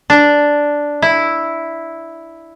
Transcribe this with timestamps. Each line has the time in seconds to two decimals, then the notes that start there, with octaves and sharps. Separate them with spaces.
0.10 D4
1.02 E4